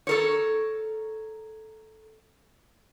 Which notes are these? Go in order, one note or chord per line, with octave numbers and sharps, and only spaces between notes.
A4 A#4 C#5